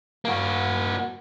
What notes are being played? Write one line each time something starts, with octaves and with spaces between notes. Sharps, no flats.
A#3 F#4